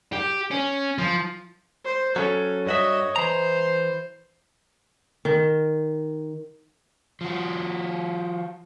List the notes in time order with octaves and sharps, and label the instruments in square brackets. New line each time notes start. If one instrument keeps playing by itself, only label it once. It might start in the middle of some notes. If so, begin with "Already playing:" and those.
[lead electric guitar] G4
C#4
F3
[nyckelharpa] C5
[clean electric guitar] F#3 C#4 [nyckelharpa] A4
[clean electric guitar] G2 F#4 E5 [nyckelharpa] C#5 D#5
[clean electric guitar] E3 A#5 [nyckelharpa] C5
[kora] D#3
[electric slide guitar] F3 F#4